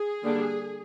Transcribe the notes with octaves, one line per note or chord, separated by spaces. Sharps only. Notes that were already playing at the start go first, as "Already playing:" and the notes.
Already playing: G#4
D3 G3 A#3 D4